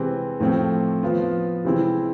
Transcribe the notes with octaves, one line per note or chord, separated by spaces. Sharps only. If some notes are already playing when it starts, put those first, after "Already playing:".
Already playing: C3 E3 G#3 C4
A2 F3 A3 C4
F3 B3 F4
C3 E3 G#3 C4 E4